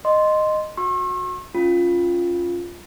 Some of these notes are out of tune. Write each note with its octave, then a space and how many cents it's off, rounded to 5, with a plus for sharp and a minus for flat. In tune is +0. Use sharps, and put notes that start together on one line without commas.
D#5 -10 C6 +0
F#4 -20 C#6 -45 E6 +15
C#4 +0 F4 +0